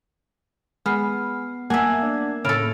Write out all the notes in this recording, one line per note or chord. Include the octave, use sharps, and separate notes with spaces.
G#3 B3 F6 C7
A#3 E5 F#5 G#5 A5 G#6
D4
A2 C#3 A4 F6 D7 F7